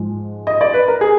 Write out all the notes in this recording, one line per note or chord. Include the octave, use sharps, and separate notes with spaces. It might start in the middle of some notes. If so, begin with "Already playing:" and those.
Already playing: G#2 F3 G#3
D#5
D5
B4
A#4
G#4